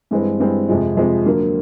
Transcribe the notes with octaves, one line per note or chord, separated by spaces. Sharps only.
G2 E3 G#3 C4
G2 E3 G#3 C4
F2 C3 F3 G#3
F2 C3 F3 G#3
D3 F#3 A#3